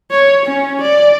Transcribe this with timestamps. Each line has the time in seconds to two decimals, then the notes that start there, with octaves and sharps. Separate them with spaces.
0.11 C#5
0.46 C#4
0.82 D5